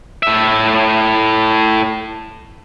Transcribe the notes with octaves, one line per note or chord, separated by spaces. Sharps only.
A2 E5